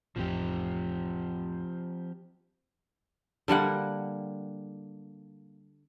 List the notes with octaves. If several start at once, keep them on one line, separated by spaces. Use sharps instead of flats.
A1 F2 F3 C4 G4
D3 G3 A#3 F#5